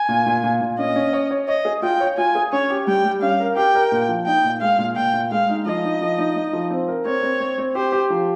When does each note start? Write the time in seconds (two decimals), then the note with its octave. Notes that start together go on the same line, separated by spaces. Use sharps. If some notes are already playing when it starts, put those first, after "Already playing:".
Already playing: G#5
0.09 A#2
0.26 A#2
0.44 A#2
0.61 A#2
0.78 C#4 D#5
0.96 C#4
1.13 C#5
1.31 C#5
1.48 C#5 D#5
1.65 G#4
1.82 F4 G5
2.00 C#5
2.17 F4 G#5
2.35 G#4
2.52 C#4 C#5
2.70 G4
2.87 G3 G5
3.05 G3
3.22 C#4 F5
3.40 A#4
3.56 G4 G5
3.75 A#4
3.92 A#2
4.09 F3
4.26 D#4 G5
4.44 A#2
4.61 G#3 F5
4.78 A#2
4.96 A#2 G5
5.13 A#2
5.31 G#3 F5
5.49 D#4
5.66 F3 D#5
5.83 D#4
6.01 F3
6.18 D#4
6.36 D#4
6.53 F3
6.70 C4
6.88 A#4
7.05 C4 C#5
7.23 C4
7.40 C4
7.58 C4
7.75 G4 C5
7.92 G4
8.10 F3